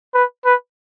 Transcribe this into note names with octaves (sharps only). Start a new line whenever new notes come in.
B4
B4